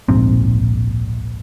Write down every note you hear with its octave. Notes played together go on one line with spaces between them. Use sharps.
D1 A#1 G#2 C4